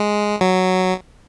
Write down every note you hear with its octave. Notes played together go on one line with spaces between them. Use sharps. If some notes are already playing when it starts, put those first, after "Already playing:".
Already playing: G#3
F#3